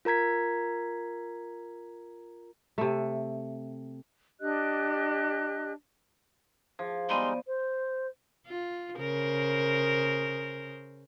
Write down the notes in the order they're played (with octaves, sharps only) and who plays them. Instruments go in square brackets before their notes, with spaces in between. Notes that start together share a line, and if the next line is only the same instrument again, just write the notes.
[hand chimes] F4 A#4 A#5 G#6 B6
[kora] C3 A3
[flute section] D4 G4 D#5 F#6
[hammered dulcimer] F3 [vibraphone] G#4
[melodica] G3 G#3 D#4 [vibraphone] B3 D5 [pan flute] C6
[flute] C5
[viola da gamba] F4
C#3 A#4 C5